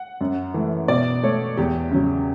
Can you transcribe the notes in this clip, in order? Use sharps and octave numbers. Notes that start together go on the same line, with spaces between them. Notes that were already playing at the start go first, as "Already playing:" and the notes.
Already playing: F#5
F#2
E3 A3
B2 D5
A3 C#5
E2 G4
C#3 F#3